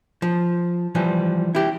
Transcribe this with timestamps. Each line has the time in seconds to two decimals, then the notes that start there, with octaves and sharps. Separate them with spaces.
0.22 F3
0.95 E3 F3 G3
1.55 E4 G4